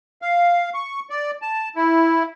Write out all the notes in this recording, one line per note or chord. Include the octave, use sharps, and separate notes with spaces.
F5
C#6
D5
A5
E4